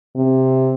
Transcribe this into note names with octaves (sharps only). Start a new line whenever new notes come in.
C3